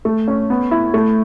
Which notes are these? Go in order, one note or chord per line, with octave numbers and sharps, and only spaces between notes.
A3
C#4
B3
E4
A3